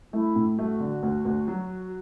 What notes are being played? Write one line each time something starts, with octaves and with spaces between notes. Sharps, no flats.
A3 E4
A2
A3 F#4
D3
D2
D2
F#3